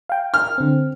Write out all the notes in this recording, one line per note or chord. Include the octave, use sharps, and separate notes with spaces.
F5 G5
F6
D3 C4